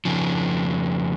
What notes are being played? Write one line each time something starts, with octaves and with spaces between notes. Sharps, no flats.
F2 C#3 F3